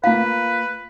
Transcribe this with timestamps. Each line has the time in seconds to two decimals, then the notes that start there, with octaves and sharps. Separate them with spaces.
0.04 A#3 F4 B4 F5